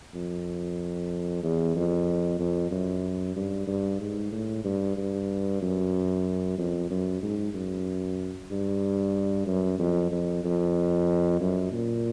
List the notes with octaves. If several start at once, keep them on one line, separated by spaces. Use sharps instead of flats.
F2
E2
F2
F2
F#2
G2
G2
G#2
A2
G2
G2
F#2
F2
F#2
G#2
F#2
G2
F#2
F2
F2
F2
F#2
A#2